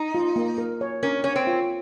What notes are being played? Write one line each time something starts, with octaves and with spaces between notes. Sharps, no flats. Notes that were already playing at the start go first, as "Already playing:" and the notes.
Already playing: D#4
F4
A#3
A#4
C#5
C#4 A#4
C#4 C#5
C4
F4